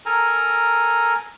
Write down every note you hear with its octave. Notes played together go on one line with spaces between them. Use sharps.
A4 A#4 G#5 A#5